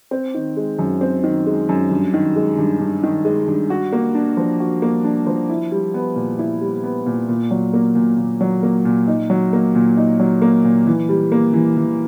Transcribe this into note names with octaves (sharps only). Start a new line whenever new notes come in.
C4
D#3
G#3
F#2
C4
D#3
G#3
F#2
G2
D#3
G#3
G2
G2
D#3
G#3
G2
F#4
A#3
D4
F3
F#4
A#3
D4
F3
E4
G3
B3
A#2
E4
G3
B3
A#2
A#2
F#3
A#3
A#2
A#2
F#3
A#3
A#2
D#4
F#3
A#3
A#2
D#4
F#3
A#3
A#2
E3
G3
A#3
E3
E3